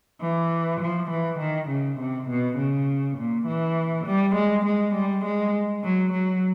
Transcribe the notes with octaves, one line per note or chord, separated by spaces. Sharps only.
E3
F3
E3
D#3
C#3
C3
B2
C#3
A#2
E3
G3
G#3
G#3
G3
G#3
F#3
F#3